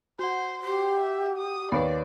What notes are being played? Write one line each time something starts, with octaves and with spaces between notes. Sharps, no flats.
F#4 C5 F#5
G4 C5
E5
D#6
D#2 B4 C#5 D5 B5